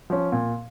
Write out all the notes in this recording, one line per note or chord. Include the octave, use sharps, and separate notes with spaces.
F3 C#4
A#2